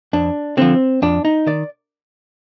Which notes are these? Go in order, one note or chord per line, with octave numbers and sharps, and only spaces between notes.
F2 D4
D3 F3 C4
F2 D4
D#4
D#3 D5